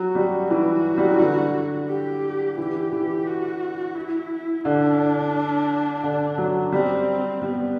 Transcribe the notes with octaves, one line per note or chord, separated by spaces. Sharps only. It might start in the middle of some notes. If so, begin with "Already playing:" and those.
Already playing: F#3 F#4
G3
E3 F#4
G3
F#3
E3
D3
G4
E3 G4
E3
F#4
E4
D3 D4
D3
F#3
G3 C4
G3 B3